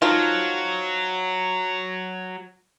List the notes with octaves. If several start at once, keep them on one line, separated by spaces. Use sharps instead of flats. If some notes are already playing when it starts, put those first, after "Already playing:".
D#3 F3 F#3 F4